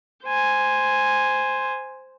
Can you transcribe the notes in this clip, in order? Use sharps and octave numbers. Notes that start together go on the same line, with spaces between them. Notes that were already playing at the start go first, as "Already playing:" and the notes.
C5 G#5